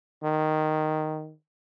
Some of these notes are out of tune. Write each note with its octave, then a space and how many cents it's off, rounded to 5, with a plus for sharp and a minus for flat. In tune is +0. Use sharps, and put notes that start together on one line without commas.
D#3 -5